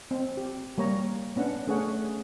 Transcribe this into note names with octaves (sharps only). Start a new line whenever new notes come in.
C4
G4
G3 A#3 C#5 A#5
B3 C#4 D4 F#5
A3 C#4 G#4 A4 C#5 F#5